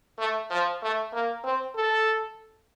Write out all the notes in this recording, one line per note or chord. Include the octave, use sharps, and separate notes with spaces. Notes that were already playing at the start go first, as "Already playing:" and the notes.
A3
F3
A3
A#3
C4
A4